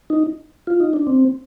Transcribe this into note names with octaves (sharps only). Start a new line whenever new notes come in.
D#4
F4
D#4
D4
C4